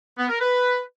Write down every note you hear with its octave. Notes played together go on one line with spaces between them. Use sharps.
B3
A#4
B4